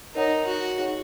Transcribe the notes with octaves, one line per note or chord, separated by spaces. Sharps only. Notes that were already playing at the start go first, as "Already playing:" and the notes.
D#4 A#4 C#5 F#5 A#5
F#4
D#4 G#4 C#5 F#5